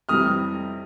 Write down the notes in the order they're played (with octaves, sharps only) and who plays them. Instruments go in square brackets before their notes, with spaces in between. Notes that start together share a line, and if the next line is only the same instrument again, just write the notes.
[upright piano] F2 C3 E3 G3 [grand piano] D#6 F6